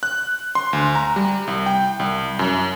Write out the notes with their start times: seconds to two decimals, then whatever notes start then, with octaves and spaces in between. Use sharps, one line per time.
0.03 F#6
0.55 C6
0.73 D2
0.95 A#5
1.16 G3
1.47 C2
1.66 G5
2.00 C2
2.39 F#2